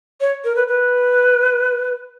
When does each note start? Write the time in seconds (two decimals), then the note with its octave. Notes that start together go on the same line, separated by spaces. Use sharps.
0.21 C#5
0.44 A#4
0.56 B4
0.67 B4